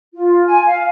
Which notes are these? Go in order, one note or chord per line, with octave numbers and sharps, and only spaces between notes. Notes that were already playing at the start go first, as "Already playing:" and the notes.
F4
G#5
F5